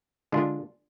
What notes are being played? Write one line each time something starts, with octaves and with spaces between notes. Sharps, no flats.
D3 G#3 D4 F4